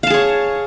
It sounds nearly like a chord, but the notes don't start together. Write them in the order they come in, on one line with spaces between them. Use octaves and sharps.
F5 A5 G#4 C#5